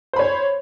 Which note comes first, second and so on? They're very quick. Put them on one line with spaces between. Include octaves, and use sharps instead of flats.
C5 B5 C#5